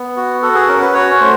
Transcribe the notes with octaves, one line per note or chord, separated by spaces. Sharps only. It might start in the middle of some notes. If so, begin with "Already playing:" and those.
Already playing: B3
F#4
F#4 A4
G#4
C#4 A#4
B4
F#4 C#5
A3 C5